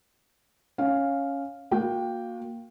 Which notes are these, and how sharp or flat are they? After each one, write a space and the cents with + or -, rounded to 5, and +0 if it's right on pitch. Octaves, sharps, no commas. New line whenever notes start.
C#4 +0 F5 +0
A#3 +0 F#4 -35 G5 +0